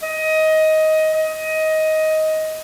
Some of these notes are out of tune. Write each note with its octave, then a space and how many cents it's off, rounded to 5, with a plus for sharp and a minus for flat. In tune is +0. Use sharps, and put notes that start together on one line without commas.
D#5 +15
D#5 +15